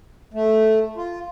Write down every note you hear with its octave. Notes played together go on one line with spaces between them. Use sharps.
A3
F4